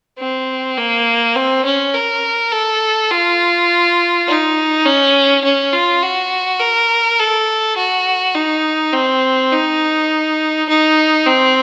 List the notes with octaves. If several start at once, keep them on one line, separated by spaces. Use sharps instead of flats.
C4
A#3
C4
C#4
A#4
A4
F4
D#4
C#4
C#4
F4
F#4
A#4
A4
F#4
D#4
C4
D#4
D#4
C4